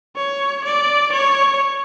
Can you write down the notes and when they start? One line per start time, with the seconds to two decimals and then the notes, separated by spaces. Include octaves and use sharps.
0.16 C#5
0.65 D5
1.13 C#5